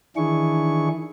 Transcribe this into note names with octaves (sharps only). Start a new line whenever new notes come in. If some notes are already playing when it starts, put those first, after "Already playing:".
D#3 E3 D4 E4 G#4 C#6